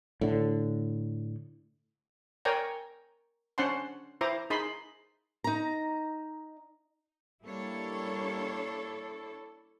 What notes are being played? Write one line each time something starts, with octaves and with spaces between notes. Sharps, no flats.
A2 D3
A#4 C#5 D5 G5 G#5 A#5
C#4 D4 C5 F#5 A5 C6
E4 C5 A#5 D6
D#4 G#4 B5 C6
D#4 A#5
G3 A#3 D4 E4 A4 C#5